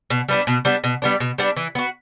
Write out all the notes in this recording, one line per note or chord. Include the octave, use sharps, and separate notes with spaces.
B2
G3 B3 D4
B2
G3 B3 D4
B2
G3 B3 D4
B2
G3 B3 D4
E3
B3 F#4